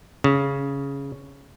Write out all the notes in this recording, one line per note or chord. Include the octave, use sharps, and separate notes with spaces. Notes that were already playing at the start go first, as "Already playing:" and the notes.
C#3